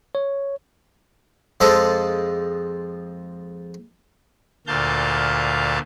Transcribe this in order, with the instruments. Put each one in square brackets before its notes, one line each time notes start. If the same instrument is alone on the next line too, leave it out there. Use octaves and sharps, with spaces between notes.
[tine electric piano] C#5
[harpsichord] F2 F3 G#3 A4 D#5
[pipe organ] D2 A#2 F5 A5 G6